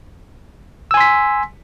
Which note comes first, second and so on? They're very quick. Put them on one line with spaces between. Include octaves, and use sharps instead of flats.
E6 G#5 C6 B6